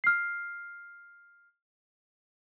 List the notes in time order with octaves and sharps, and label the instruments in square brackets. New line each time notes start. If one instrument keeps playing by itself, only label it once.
[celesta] F6 C7